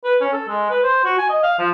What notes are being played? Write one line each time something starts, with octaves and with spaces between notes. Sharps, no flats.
B4
C#4
A4
G#3
B4
C5
F#4
G#5
D#5
F5
F3